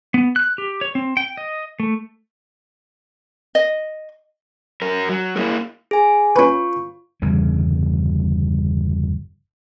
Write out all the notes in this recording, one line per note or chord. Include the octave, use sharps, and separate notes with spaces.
B3
F#6
G4
C#5
C4
G5
D#5
A3
D#5
F#2 A#4
F#3
A#3 E4 G#4 A#4
G#4 G#5
C#4 F4 B4 C#6
G1 E2 C#3 G3